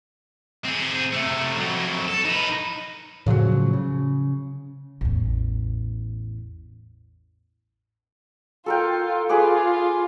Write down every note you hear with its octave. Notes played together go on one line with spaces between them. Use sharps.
C4 G#4
C3 A3
F2 F#3
A4
D#4 B4
A2 C#3 F3 F#3
C#3
A1 E2
F4 A4 A#4 G5
F4 G#4 B4 D6